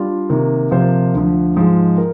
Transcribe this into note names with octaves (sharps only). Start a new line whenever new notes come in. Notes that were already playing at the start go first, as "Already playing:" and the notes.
Already playing: G3 D4 F4
C3 D#3 A#3
C3 F3 A#3 F4 C5
D2 D3 F3
G#2 F3 G#3
A#4